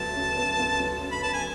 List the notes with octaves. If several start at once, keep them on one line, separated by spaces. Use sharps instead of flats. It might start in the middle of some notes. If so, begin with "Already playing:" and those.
Already playing: D2 F#3 B3 A5
C#3
B3
D2
F#3
C#3
B5
B3 A5
G#5